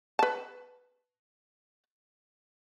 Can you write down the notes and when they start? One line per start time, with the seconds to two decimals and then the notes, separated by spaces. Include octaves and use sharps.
0.19 B4 A5